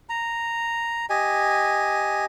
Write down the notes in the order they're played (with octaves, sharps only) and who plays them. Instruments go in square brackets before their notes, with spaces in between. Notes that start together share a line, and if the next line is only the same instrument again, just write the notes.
[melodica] A#5
G4 D#5 G#5